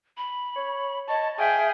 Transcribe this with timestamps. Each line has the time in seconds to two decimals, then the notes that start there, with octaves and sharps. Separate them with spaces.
0.17 B5
0.55 C#5
1.09 C#5 D#5 A5
1.39 G#4 E5 F5 G5